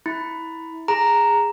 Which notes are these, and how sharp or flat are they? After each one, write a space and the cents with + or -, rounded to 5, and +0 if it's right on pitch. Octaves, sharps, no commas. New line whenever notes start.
E4 -20 B5 +10
G#4 -10 A#5 +0